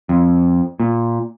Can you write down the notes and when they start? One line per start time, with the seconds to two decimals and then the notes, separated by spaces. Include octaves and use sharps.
0.09 F2
0.80 A#2